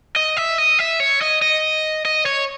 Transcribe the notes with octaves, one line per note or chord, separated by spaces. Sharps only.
D#5
E5
D#5
E5
C#5
D#5
D#5
D#5
C#5